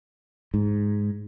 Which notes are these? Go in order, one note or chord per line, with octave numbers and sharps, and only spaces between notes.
G#2